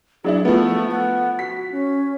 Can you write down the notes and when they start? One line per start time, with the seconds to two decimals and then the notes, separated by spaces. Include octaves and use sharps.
0.24 F#3 D4 E4 G#4
0.45 F3 A3 B3
0.91 F#5
1.39 F#4 B6
1.72 C#4